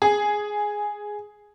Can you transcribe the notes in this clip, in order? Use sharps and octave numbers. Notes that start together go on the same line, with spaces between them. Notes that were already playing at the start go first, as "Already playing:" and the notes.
G#4